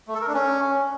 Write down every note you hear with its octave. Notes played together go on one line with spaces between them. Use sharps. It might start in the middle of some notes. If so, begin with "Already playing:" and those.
A3
A4
A#4
D4
C#4